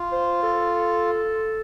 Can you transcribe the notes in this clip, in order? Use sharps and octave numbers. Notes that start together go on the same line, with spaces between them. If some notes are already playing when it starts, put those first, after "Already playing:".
Already playing: F4
C5
A4